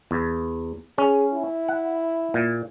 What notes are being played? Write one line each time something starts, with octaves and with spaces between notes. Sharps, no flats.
E2
C#4 G#4
E4
F#5
A#2